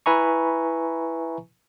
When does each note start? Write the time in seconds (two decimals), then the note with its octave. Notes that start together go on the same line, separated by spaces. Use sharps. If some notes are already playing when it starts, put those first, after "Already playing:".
0.06 E4 B4 E5 G#5 A#5 C#6